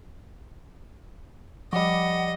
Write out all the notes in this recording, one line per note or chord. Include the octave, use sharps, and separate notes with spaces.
F3 G3 D#5 F#5 D6